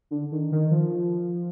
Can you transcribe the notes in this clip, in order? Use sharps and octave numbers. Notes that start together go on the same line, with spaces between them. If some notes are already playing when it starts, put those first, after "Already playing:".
D3
D#3
D#3
F3